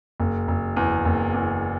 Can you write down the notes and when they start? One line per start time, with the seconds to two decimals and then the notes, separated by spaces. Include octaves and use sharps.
0.20 F#1
0.48 F#1
0.77 E2
1.05 F#1
1.34 E2